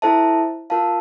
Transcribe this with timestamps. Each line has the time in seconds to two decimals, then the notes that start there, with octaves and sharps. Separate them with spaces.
0.02 E4 A4 C5 E5 A5
0.70 F4 A#4 F5 A5